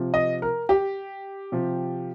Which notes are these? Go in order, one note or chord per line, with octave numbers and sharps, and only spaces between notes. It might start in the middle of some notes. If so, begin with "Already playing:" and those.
Already playing: C3 F3
D#5
A#4
G4
C3 F3